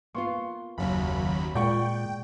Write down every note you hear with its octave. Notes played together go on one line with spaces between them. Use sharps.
A#3 B3 F4 C6 C#6
F#1 D#2 F#3 B5
A#2 G#3 D5 F#5 G5 C#6